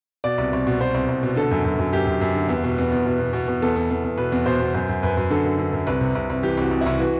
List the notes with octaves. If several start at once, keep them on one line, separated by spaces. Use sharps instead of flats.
B2 D5
C2
C2
B2
B2 C5
C2
C2
B2
D3 A4
F#2
F#2
F#2
F#2 G4
F#2
F#2
D3
E2
B2
E2
E2
B2
B2
B2
B2
E2 A4
E2
E2
E2
B2 B4
E2
B2 C5
B2
F#2 C5
F#2
F#2 B4
F#2
D3 A4
F#2
D3
F#2
C2 B4
C3
C2
C2
E3 G4
C2 F#4
C2
C2 E4
E3 F#4